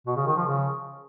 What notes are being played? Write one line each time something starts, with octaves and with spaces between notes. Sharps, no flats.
B2
C#3
D#3
F3
C#3